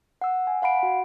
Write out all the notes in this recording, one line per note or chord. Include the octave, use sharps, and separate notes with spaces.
F#5 E6
G#5
F5 F#5 B5 D7
F#4